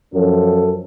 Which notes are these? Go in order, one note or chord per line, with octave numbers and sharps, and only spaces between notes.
F#2 F3 C#4 A4